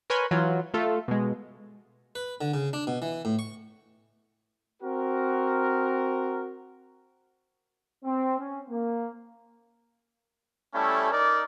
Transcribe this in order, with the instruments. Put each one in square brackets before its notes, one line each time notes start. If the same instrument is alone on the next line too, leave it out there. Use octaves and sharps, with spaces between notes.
[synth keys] A#4 B4 C#5 G#5 B5 C6
E3 F#3 F4
A3 F4 A4
B2 G#3
[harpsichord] B4
D3
C#3
D4
B2
E3
A2
C#6
[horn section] C4 F#4 A#4
[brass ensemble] C4
C#4
A#3
[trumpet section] G3 A3 C#4 E4 A4
D#4 A#4 D5